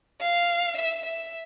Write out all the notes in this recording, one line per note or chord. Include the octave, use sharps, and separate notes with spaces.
F5
E5
E5